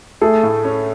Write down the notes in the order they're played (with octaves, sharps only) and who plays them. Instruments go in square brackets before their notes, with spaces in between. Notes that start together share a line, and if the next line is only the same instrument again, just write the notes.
[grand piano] A3 A4 [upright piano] G#4
[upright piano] A2
C#4